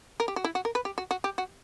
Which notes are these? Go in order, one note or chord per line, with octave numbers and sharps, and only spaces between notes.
A#4
G4
F#4
E4
F#4
A#4
B4
G4
F#4
F#4
G4
F#4